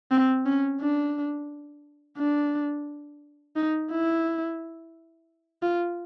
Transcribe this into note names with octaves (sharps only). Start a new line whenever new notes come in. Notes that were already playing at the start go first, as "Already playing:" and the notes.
C4
C#4
D4
D4
D#4
E4
F4